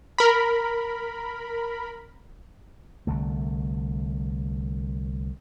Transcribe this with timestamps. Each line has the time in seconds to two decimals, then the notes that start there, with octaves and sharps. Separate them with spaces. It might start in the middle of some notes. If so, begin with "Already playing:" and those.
0.18 A#4 B5
3.07 C2 D3 A3